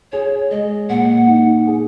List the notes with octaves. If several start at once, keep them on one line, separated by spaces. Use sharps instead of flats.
G#4 C#5
G#3 D#5
A#2 F#5
D#4
G#4